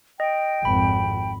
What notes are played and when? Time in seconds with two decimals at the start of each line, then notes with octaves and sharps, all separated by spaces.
0.20 D#5 G5
0.65 G#1 F2 B5